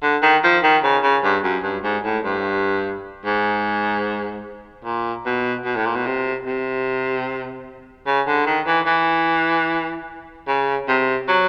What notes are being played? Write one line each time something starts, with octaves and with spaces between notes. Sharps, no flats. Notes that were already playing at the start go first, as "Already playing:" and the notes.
D3
D#3
F3
D#3
C#3
C#3
G2
F#2
G2
G#2
A2
G2
G#2
A#2
B2
B2
A2
A#2
B2
C3
C3
C#3
D3
D#3
E3
E3
C#3
C3
F#3